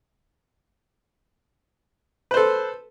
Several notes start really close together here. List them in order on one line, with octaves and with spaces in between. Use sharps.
B4 C5 A4